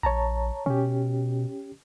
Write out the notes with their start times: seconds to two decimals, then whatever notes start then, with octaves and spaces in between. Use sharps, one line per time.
0.03 A#1 C#5 A5 A#5
0.66 B2 C#4 G4